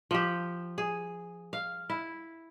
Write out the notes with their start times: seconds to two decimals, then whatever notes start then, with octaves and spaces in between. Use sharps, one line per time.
0.11 F3 G4
0.78 G#4
1.53 F5
1.90 E4